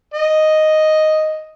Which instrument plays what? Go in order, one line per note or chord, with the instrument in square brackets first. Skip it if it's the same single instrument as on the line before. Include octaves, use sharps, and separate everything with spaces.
[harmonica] D#5